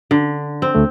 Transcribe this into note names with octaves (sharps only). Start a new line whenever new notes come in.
D3
C4
D2 A3